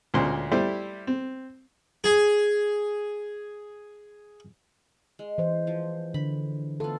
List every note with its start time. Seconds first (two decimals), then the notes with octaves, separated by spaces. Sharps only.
0.14 D2 A#2 G#3 C#4 C5 C6
0.52 G3 A3 E4 G4 C5
1.07 C4
2.04 G#4 G#5
5.19 G#3
5.38 E3 C5
5.67 F3
6.14 D3 B5
6.80 B3 F4 A4